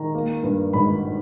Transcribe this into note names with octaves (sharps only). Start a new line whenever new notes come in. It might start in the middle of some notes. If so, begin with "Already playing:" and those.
Already playing: D#3 A#5
A#3
G2
G#1 B5